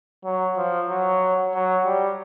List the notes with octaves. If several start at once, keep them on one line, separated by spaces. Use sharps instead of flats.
F#3
F3
F#3
F#3
G3